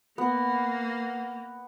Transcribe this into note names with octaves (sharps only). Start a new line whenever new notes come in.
A#3 B3